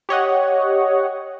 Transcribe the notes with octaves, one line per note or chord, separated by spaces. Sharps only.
G4 C#5 D#5 F#5